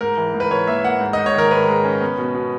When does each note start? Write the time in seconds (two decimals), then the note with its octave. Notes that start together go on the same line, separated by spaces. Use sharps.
0.01 G#2 A#4
0.17 E3
0.34 G#2
0.40 B4
0.51 E3 C#5
0.67 A#3 E5
0.84 A#3 F#5
1.01 G#2
1.13 G#2 D#5
1.26 C#5
1.35 D#3 A#4
1.51 G#2 B4
1.68 G#3
1.85 C#4
2.01 B3
2.18 B2
2.35 B2